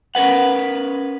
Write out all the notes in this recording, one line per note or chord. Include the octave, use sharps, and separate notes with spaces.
C#4 A#4 B4 F#5